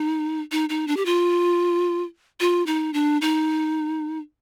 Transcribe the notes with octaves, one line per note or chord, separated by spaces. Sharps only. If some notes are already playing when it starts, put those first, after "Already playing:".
Already playing: D#4
D#4
D#4
D4
G4
F4
F4
D#4
D4
D#4